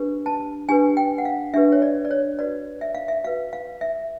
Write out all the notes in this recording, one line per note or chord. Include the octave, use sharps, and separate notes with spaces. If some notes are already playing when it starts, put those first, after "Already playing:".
Already playing: D4 G4 B4
A5
D4 G4 B4 G#5
G5
F#5
F5
D4 G4 B4 E5
C#5
D5
D5
C#5
F#4 B4 D5
E5
F5
E5
F#4 B4 F5
F5
E5